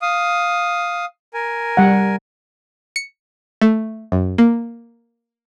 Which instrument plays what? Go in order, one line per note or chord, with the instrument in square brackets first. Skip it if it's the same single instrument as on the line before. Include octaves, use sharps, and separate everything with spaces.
[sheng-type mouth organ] F5 D#6
A#4 G#5
[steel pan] G3 F#5
[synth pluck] C#7
A3
F#2
A#3